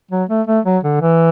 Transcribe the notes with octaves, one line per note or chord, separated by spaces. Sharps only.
F#3
A3
A3
F#3
D3
E3